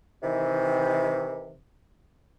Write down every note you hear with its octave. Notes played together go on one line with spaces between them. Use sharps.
C3 D#3 E3